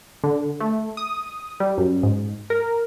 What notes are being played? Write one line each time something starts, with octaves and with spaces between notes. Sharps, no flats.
D3
A3
D#6
G3
F#2
G#2
A#4